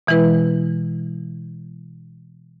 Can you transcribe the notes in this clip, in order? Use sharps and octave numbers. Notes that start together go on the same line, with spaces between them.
B2 E3 G#3 E4 B4